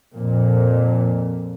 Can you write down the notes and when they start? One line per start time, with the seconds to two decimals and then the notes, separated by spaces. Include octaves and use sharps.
0.14 F2 A#2